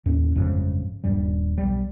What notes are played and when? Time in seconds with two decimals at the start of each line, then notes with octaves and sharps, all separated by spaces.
0.06 D#2 A2 C#4
0.36 G1 F2 G#2 C#3
1.04 D#1 G2 G3
1.58 B1 G3